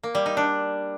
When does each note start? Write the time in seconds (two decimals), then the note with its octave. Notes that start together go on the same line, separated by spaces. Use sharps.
0.03 A#3
0.15 G3
0.26 D#4
0.37 D4